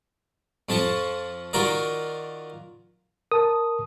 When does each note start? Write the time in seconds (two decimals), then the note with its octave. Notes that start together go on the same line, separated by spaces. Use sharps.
0.69 F2 F3 A5 C#6
1.53 D#3 F4 F#4 A#4 D5
3.32 A#4 A5 D#6